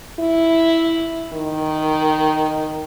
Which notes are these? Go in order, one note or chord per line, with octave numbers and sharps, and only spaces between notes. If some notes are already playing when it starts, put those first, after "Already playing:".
E4
D#3